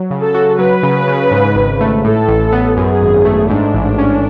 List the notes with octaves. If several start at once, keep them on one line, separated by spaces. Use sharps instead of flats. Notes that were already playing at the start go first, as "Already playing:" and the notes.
Already playing: F#3
C#3
A4
F#4
F#3 B4
C#3
C#3
G#2
G#1
A3
A2 A4
A1
B3
F#2 G#4
G#1
A3
G#2 D4
A1
C#4